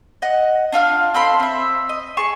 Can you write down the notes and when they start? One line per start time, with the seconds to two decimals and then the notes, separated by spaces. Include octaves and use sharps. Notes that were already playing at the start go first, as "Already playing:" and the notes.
0.22 D#5 F#5
0.72 D4 F4 F5 F6
1.14 C4 A4 B5 C6
1.40 C4 E5
1.89 D#5
2.17 G#4 A5 C#6